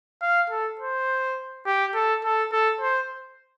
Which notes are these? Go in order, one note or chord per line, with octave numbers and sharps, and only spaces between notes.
F5
A4
C5
G4
A4
A4
A4
C5